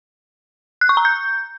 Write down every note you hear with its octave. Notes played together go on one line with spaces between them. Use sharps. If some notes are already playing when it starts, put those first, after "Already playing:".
F#6
C#6
A#5
G6